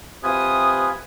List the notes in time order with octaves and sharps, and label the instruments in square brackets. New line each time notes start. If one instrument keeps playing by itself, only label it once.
[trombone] C3 [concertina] F4 B4 G#5 [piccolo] D#6